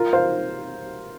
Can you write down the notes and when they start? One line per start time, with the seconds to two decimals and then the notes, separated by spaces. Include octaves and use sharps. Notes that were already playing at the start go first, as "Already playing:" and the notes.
Already playing: F4 A#4
0.13 C5 F5